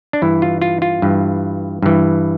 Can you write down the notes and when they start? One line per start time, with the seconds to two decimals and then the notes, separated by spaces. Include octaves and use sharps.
0.13 D4
0.22 G2 E3 E4
0.42 F4
0.62 F4
0.82 F4
1.02 G2 E3
1.82 G2 E3